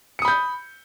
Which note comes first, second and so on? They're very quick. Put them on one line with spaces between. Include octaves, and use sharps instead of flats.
C#7 D#6 B5 G6